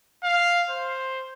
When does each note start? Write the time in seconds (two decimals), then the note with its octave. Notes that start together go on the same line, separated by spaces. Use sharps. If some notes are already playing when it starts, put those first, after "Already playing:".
0.24 F5
0.70 C5